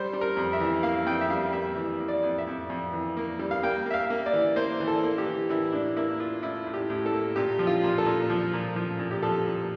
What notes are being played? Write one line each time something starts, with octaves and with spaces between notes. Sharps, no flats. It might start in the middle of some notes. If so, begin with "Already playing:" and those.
Already playing: G3 C5
G3
A#4
F2
E5
E3
A#3 F5
F2 G5
E5
G3 F5
A#3 E5
E3
A#3
D5
F2
E5
F2
F2
E3
A#3
G3
F5
A#3 G5
A#3 E5
F5
A#3
D5
E3
A#3 C5
E3
A4
A#3
G4
E3
E3 E4
A2 D4
A#3 E4
A#3 F4
A2 E4
A2
G4
A2
A4
A#3
A#2 G4
F3
F4
A#2
A4
A#2
F3
A#2
F3
A#2
G4
F3 A4
A#2